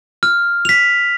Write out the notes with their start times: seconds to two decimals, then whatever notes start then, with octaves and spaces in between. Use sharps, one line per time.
0.23 F6
0.65 B6 F7